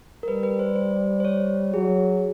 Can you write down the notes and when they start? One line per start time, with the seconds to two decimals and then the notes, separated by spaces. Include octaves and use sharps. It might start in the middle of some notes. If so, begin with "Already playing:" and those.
0.23 A#4
0.27 G3 B4
0.43 B4
0.59 C5
0.76 C5
1.20 C5
1.25 C#5
1.74 F#3 G#4